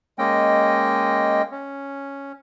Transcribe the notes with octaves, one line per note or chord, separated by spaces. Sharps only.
G#3 A#3 C#4 D#5 G5
C#4